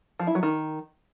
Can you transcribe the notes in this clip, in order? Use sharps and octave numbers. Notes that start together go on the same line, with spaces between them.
F3
E4
F#3
D#3